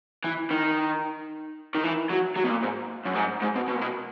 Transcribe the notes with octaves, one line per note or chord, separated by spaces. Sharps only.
E3
D#3
D#3
E3
F#3
F#3
B2
A#2
G#2
F#2
G#2
G#2
B2
B2
A#2
B2